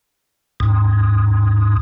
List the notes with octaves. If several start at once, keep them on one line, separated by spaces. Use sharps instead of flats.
D#2 G#2